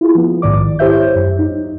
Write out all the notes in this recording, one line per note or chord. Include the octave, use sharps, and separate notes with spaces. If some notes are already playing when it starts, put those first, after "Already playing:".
E4 F4 G#4
F3 B3
A#1 G#2 D#3 D5 D6
E4 G4 C5 C#5 E5 G6
F#2
D#4